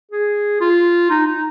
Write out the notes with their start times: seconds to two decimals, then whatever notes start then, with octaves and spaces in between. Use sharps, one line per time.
0.12 G#4
0.61 F4
1.10 D#4
1.26 D#4